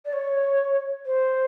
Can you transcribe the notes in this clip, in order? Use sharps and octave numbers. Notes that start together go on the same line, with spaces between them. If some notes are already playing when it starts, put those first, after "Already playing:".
D5
C#5
C5